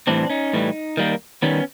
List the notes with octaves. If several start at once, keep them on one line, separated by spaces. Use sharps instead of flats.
A2 E3 G3 C4 D4
C#4 D#4
A2 E3 G3
D#3 G3 A#3
D#3 G3 B3 C#4